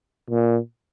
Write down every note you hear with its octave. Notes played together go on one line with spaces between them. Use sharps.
A#2